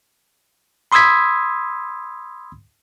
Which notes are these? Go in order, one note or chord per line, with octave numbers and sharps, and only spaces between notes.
B5 C6 D#6 E6 G#6 B6